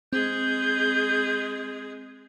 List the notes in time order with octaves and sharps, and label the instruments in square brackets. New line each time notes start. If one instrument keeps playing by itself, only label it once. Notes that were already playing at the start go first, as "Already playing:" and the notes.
[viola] G#3 G#4 [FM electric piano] C4 [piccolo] G6